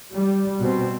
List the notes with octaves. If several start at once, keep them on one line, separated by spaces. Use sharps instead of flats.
G3
B2 C4